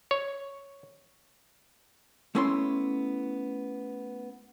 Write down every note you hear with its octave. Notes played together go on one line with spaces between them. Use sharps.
C#5
A3 B3 C#4 E4 E5 C6